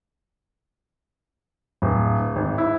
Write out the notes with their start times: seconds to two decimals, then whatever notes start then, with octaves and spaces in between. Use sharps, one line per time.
1.82 D1
2.36 G#1
2.58 E4